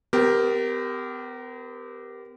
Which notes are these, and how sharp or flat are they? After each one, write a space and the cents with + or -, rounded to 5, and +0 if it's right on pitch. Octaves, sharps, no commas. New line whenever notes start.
B3 +45 G4 +0 A#4 +0